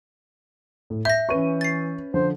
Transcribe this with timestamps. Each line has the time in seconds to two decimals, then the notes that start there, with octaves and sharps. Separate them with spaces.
0.90 A2
1.05 E5 G6 A#6
1.29 E3 C#4 B4 C#6 D#7
1.61 A6 C7
2.14 D3 F3 C5